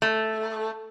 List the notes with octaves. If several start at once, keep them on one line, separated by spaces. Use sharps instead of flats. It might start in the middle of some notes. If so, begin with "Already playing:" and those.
A3